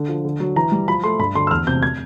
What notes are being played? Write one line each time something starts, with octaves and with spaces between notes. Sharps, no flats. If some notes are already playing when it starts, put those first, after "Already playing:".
Already playing: D3
F3
D3
F#3
E3 A#5
G3
F3 B5
A3 C6
G2 B5
D3 C6
E6
E2 F6
C3 G6
G#6